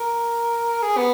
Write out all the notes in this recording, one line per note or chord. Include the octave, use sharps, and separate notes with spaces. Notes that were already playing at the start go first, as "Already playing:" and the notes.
Already playing: A#4
G#4
B3